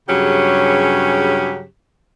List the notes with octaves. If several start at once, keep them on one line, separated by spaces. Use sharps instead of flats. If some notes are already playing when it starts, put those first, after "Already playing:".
G2 C#3 F#3 C#4 G4 G#4